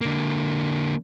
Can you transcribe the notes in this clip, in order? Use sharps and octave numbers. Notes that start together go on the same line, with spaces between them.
D3 A#3